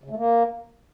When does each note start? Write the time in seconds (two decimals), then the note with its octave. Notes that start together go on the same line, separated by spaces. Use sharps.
0.04 C#3
0.10 A3
0.16 A#3